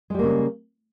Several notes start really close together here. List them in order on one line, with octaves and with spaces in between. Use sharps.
G#3 G3 A#3 C#3